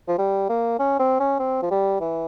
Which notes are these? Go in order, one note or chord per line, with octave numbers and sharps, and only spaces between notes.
F3
G3
A#3
C#4
C4
C#4
C4
F3
G3
E3